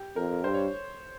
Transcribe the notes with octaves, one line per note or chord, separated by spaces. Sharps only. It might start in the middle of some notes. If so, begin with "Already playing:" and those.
Already playing: G4
F2 A#4
G2 C5
C#5